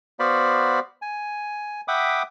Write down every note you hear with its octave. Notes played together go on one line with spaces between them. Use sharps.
B3 F#4 C5 D5 F5 B5
G#5
E5 F#5 G5 B5 D6 D#6